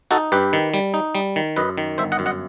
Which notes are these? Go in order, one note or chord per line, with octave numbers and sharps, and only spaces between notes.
D#4 F#4 A4
G2 G4 B4
D#3
G3
D#4
G3
D#3
F#2 B4 D#5
D#3
G1 C5 E5
D#5 F#5
F#2
D#5 F#5